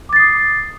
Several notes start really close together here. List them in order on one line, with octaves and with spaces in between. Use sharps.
D6 A6 C7 D#6